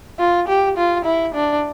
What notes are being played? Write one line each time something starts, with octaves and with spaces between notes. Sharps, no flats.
F4
G4
F4
E4
D4